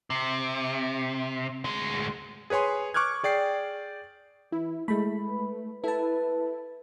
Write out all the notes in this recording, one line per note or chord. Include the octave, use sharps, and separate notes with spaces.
C3
D2 G#3
G#4 B4 C#5 G#5 C6
C#6 D6 F6 F#6 G#6
G#4 D5 G5 C7
E3 E4
G#3 A3 E4 B5
B4
E4 A4 B4 A5